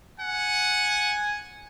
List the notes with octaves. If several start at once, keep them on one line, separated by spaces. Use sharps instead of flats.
F#5 G#5